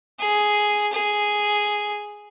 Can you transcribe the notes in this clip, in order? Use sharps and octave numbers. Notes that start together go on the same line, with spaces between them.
G#4
G#4